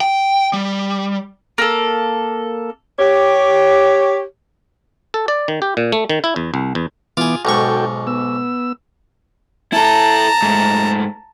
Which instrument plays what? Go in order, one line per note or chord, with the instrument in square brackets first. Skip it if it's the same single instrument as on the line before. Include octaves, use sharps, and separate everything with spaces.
[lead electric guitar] G5
G3
[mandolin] A#3 A4
[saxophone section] G4 C#5
[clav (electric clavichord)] A4
D5
D#3
G4
A#2
A3
D#3
E4
E2
C2
E2
[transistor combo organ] E3 B3 D6 [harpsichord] F4 G#4
[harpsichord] B1 G#2 C#6 [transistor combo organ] F#4 A4 G5
[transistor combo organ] B3 E6
[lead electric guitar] E4 A4 [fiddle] A5 A#5
[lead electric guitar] G#2 A3